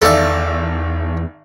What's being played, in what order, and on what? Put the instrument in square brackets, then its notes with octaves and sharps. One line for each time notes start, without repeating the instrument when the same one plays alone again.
[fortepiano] G#1 D5 E5 [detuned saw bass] E2 [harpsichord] A4 F5